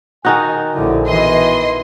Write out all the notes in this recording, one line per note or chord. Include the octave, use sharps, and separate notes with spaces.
D#3 D#4 F#4 G#5
A#1 D3 F#3 G3 E4
B2 E3 D#5 C6